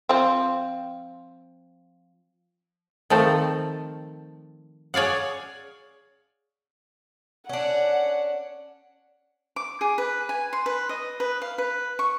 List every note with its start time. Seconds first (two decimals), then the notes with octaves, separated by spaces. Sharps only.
0.09 F3 C4
3.10 D#3 F3 A3 C4 A4
4.94 G#4 C#5 D5 F5 F#5
7.49 C#4 D4 F#5
9.56 D6
9.81 G#4
9.98 B4
10.29 G#5
10.53 C6
10.66 B4
10.89 D#5
11.20 B4
11.42 F5
11.58 B4
11.99 C#6